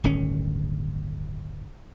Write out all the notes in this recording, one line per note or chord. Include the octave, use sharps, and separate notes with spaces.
D1 G1 D#3 C#4